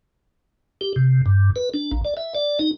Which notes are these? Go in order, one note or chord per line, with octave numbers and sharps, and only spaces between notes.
G4
C3
G2
B4
D4
A#1
D5
E5
D5
D#4